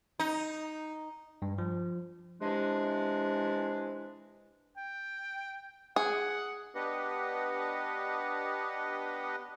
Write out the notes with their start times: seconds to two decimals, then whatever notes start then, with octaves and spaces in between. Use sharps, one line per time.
0.20 D#4
1.42 G2
1.58 F3
2.41 C3 E3 G#3 D4
4.77 G5
5.96 G#4 F#5
6.75 B3 D4 G4 B4 D#5 F#5